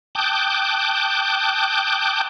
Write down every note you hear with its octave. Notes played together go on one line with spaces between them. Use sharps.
G5 A5 D6 D#6 F#6 G6